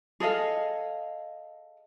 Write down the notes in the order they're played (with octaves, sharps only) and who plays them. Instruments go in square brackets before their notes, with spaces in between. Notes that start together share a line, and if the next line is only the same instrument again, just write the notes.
[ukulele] G#4 A4 D#5 F5